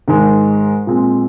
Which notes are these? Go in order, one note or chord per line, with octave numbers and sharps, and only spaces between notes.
G#2 D#3 G#3
A#2 G#3 C4